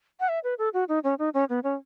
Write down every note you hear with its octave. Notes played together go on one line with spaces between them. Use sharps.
F#5
E5
B4
A4
F#4
D#4
C#4
D#4
C#4
B3
C#4